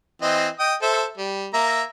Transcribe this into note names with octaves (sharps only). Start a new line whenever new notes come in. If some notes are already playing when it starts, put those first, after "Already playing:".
E3 C4 D#5
D#5 G5 D#6
A4 C5 E5
G3
A#3 E5 A#5